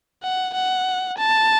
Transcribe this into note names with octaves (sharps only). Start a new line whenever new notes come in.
F#5
F#5
A5